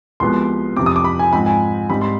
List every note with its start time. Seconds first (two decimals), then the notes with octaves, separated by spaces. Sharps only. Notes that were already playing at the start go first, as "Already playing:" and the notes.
0.20 C2 C3 F3 G#3 B3 C6
0.76 F2 C3 F3 C4 D6
0.86 D#6
0.96 D6
1.04 B5
1.19 G#5
1.33 G#2 F3 C4 D#4 B5
1.46 G#5
1.90 G#2 G3 C4 D#4 B5
2.01 C6